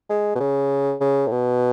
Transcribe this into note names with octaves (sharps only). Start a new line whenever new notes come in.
G#3
B2
C#3
C#3
A2
B2